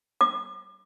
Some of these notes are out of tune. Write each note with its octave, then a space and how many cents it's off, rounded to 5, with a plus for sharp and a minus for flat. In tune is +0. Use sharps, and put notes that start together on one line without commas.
D6 +35